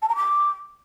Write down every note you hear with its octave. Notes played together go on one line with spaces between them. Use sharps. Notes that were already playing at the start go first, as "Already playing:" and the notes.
A5
A#5
D6